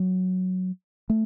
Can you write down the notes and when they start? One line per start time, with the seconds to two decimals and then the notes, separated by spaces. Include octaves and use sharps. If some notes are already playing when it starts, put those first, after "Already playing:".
Already playing: F#3
1.10 A3